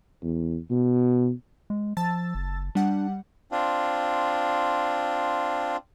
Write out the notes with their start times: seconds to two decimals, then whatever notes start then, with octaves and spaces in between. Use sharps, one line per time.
0.23 E2
0.70 B2
1.70 G#3
1.97 F3 A5 E6 A6
2.35 F#1
2.75 G3 D4 F#5
3.51 C4 D4 F4